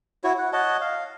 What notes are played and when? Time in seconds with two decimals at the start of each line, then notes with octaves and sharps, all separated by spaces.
0.24 E4 F#4 C#5
0.38 F#5
0.53 C#5 D#5 F#5 A5
0.81 F5